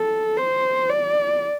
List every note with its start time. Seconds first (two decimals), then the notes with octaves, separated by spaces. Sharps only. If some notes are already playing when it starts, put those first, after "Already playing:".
Already playing: A4
0.37 C5
0.89 D5